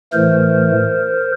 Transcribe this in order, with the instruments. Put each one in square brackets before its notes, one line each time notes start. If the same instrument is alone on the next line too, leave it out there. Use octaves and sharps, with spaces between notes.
[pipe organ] A2 E3 A3 A#4 C5